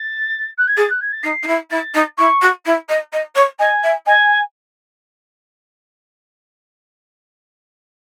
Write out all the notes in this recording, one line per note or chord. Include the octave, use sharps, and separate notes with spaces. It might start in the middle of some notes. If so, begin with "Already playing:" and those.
Already playing: A6
F#6
G#6
G#4 A6
F#6
G#6
A6
D#4 C7
D#4
E4
E4 A6
D#4
E4 C#6
F#4
E4
D#5
D#5
C#5
D#5 G#5
E5
D#5 G#5